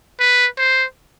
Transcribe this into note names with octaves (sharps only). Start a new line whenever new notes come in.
B4
C5